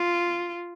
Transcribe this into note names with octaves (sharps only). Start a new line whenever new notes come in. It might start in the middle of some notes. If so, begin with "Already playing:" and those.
Already playing: F4